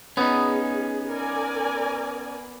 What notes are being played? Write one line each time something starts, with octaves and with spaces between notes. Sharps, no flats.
B3 C#4 D#4 G#4
A#4 D5 G#5